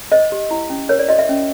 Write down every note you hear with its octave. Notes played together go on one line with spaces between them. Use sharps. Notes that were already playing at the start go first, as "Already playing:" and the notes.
C5 D#5
G4
E4
C#4
A#4 C#5
D5
F#4 D#5
E5
C#4